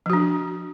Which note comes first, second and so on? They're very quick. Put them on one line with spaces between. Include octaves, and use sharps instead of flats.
F3 F#4 D4